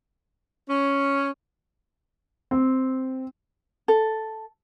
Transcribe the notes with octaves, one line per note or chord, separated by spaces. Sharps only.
C#4
C4
A4